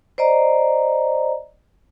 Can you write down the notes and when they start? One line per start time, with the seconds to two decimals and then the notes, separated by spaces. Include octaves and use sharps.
0.18 C5 D5 D#5 A#5